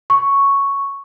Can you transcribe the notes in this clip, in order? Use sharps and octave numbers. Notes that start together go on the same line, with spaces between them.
C#6